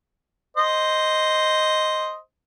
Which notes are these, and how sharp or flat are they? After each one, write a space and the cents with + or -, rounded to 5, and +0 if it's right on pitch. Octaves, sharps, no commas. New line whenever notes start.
C5 +0 D#5 +0